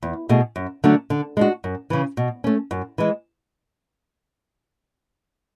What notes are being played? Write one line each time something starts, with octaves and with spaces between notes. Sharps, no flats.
E2
B2 A3 E4 G#4
F#2
D3 F#3 A3 D4
D3
G#3 D4 F#4
F#2
C#3 E3
B2
A3 C#4
F#2
E3 G#3